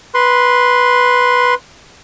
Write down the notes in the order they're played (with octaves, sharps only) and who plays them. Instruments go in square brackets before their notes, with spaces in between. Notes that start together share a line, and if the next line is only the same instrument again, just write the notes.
[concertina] B4 C6